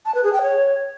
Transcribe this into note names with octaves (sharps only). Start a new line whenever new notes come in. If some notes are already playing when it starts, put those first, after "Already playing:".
A5
B4
G#4
G5
C#5